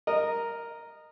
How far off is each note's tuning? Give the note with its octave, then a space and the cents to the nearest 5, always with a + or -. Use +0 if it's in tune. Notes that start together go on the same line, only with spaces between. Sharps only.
A#4 +0 D#5 -15